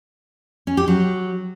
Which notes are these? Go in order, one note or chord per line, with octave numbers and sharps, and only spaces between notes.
C#4
G4
F#3